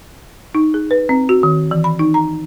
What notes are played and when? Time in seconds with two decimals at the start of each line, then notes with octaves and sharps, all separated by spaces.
0.55 D#4
0.74 G#4
0.91 B4
1.09 C4
1.29 F#4
1.43 D#3
1.71 E3
1.84 B5
1.99 D#4
2.14 A#5